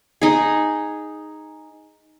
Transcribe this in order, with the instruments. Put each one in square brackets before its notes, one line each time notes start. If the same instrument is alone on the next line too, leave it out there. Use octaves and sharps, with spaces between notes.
[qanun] D#4 G#4